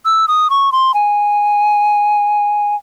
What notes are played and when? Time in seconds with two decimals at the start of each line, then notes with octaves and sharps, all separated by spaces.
0.05 E6
0.28 D#6
0.50 C#6
0.72 C6
0.94 G#5